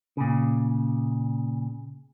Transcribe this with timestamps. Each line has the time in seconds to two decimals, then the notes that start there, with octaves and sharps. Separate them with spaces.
0.17 A#2 C#3